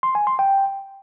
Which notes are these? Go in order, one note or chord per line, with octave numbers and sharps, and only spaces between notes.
C6
G#5
C6
G5